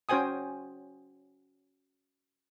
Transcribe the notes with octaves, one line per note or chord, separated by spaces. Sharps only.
C#4 F#4 C5 G5 G#5 D#6